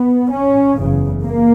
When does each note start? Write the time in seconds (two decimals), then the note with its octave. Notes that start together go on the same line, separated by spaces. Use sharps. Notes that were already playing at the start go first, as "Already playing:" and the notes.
Already playing: B3
0.31 C#4
0.78 F#1 E2 C#3
1.24 A#3